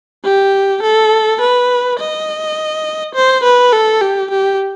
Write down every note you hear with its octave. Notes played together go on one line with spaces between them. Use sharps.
G4
A4
B4
D#5
C5
B4
A4
G4
G4